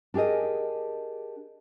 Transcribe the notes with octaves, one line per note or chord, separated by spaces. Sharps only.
D4 G4 G#4 A#4 D#5